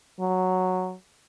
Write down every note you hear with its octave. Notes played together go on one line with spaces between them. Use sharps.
F#3